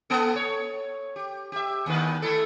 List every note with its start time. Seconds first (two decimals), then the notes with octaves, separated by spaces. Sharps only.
0.10 A#3 B3 A4
0.36 C#5
1.16 G4
1.52 G4 E5
1.86 D#2 D#3 B4
2.22 A3 E4 A4